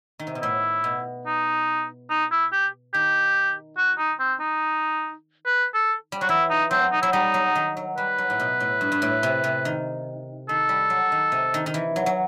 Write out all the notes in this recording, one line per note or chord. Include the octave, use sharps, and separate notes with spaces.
D#3
C3
B2
A2 E4
B2
D#4
D#4
E4
G4
D#3 G4
F#4
D#4
C4
D#4
B4
A4
G3
F#3 F#4
E3 E4
D#4
F#3 C4
D#4
F#3 E4
G3 D#4
F#3
D#3
F#3
G3 B4
F#3
A2
B2
A2
G2
G2
A2
C3
C3
D#3
D#3 A4
G3
F#3
D#3
C3
D#3
D#3
E3
F#3
F#3